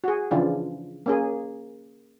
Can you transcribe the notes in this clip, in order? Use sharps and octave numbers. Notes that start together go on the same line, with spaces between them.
F#4 G#4
C#3 E3 F3 D4 E4 F4
A#3 C#4 G#4